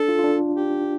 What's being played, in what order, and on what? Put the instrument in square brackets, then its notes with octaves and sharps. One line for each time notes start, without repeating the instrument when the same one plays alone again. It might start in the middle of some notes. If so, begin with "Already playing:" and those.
Already playing: [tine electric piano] D4 [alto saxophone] A4
[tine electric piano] F4
F4
D4
[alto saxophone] G4